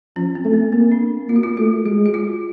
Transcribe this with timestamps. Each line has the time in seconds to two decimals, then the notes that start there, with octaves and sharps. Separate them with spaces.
0.16 F3 C#4
0.35 C4
0.44 A3
0.54 B3
0.72 A#3 C4
0.92 D4
1.29 A#3 F4
1.36 F#4
1.43 F4
1.57 A3 F#4
1.85 G#3 F#4
2.06 F#4
2.14 F4